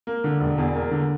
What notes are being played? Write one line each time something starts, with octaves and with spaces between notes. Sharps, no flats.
A#3
D3
E1
E2
A#3
D3